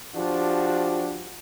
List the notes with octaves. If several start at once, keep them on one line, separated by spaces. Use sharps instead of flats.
F3 D4 F#4 G4